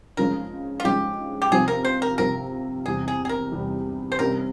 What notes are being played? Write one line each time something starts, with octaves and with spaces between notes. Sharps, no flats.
C#3 F3 G#3 C#4 A#4
F4
C#3 F3 G#3 C#4 G4
G4
C3 F3 C4 G#4
A#4
C5
A#4
C3 F3 C4 A#4
E2 C3 G3 G#4
G#4
G#4
A#4
E2 C3 G3
C5
C3 G3 A#3 C#4 E4 A#4